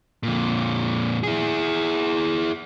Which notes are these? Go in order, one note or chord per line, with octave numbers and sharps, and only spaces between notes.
F2 A#2
E4 G#4